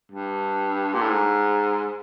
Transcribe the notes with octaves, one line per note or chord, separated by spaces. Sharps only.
G2
A#2
A2
G#2